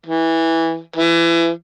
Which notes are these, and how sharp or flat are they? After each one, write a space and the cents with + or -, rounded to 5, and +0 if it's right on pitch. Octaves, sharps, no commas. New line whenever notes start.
E3 -10
E3 +30